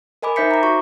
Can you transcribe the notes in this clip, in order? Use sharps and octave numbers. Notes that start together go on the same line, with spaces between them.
A#4 D#5 G#5 B5 D6
D#4 C5 E5 G6 B6 C#7
A#5 D6
F#4 C#6